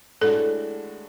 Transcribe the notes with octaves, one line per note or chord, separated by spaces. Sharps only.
A2 G#3 D4 F#4 A4